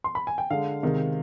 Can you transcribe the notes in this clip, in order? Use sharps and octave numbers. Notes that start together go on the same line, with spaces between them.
C6
B5
G#5
G5
D3 G#3 F5
C3 D#3 G#3